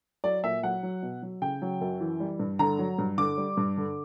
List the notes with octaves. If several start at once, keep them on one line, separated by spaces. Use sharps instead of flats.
F#3 D5
A#2 E5
F#3 F#5
F#3
B2
F#3
C#3 G5
F#3
F#2
E3
G3
G2
D3 A#5
F#3
G2
D3 D6
G3
G2
D3